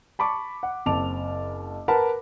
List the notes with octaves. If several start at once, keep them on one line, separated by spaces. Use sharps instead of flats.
A5 B5 C#6 D6
F#5
F#1 C4 A5 D6 F7
A#4 B4 F#5 A5 B5